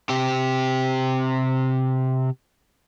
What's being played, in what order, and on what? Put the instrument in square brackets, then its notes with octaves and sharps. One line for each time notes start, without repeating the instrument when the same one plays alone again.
[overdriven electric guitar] C3 G4